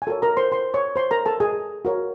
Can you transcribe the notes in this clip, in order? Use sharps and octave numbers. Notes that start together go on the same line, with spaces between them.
G#5
F#4 A4 A#4 C#5 A5
A#4 A#5
C5 C6
C5 C6
C#5 C#6
C5 C6
A#4 A#5
A4 A5
G#4 G#5
F#4 A#4 C#5